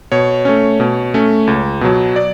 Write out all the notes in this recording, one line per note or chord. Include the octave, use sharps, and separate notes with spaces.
B2 C#5
A3 C#4
B2
A3 C#4
C#2
B2 F#3
D5